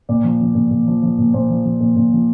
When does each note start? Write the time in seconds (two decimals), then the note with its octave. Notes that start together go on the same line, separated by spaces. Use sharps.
0.09 A#2 D5
0.24 F3
0.40 F3
0.55 A#2
0.71 A#2
0.87 F3
1.02 F3
1.18 A#2
1.34 A#2 C5
1.50 F3
1.64 F3
1.80 A#2
1.96 A#2
2.12 F3